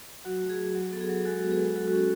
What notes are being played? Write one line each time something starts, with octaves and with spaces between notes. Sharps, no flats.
F#3 F#4
A3
G#4
F#4
F#3
B3 A4
G#4
F#3
G#4
G#3 F#4 A4
B3
G#4 B4
G#3
F#3 F#4 A4
F#4
C#4 G#4